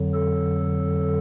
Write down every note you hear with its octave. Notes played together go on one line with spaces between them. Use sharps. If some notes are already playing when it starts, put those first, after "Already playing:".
Already playing: F2 D3 F#3
A4